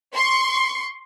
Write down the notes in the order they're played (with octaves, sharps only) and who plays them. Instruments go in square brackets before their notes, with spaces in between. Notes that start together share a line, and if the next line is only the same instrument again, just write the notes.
[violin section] C6 C#6